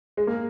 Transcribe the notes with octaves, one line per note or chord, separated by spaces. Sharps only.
G#3
A#3